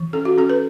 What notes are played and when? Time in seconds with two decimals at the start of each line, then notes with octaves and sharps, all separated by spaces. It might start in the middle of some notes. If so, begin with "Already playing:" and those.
Already playing: E3
0.13 C#4 A4
0.25 F#4
0.37 C#4 A4
0.50 B4